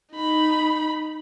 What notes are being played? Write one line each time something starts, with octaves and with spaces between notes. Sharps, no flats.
D#4 B5